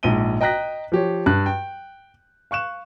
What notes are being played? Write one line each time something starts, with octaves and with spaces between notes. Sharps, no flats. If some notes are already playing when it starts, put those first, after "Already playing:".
A#1 G#2 D#7 G7
D#5 G5 A#5 F#6 A#6 B6
F3 G4 C#5
G2 F#6
G5
F5 C#6 F#6 E7